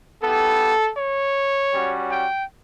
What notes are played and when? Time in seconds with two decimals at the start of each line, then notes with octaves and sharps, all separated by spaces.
0.22 B3 E4 G4 A4
0.97 C#5
1.73 G3 C#4 F#4
2.11 G5